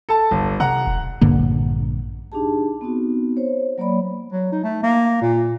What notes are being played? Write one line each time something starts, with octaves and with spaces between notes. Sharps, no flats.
A4 A5
G1
C3 F#5 A#5
E1
A#1 G2 D3 A#3
D4 D#4 G4 G#4 A5
B3 C4 D#4 F#4
C5 C#5
F#3 A#3 C#5 D5 B5
F#3
D#4
A3
A#3
A#2